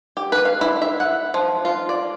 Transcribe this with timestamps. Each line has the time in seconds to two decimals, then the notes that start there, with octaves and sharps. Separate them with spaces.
0.17 G4
0.32 B4
0.45 F5
0.61 E4
0.82 E5
1.00 F#5
1.34 F3
1.65 F4
1.89 D5